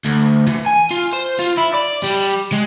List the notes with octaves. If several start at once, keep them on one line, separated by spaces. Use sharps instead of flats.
D2
E3
G#5
F4
C5
F4
E4
D5
G3
G#3